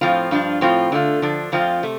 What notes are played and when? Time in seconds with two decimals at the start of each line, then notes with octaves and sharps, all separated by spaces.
0.01 A2 F3 C4 F4
0.31 G2 F3 D4 F4
0.61 A2 F3 C4 F4
0.92 D3 A3 F4
1.22 D3 F3 D4
1.52 F2 F3 A3 C4 F4
1.83 C3 A3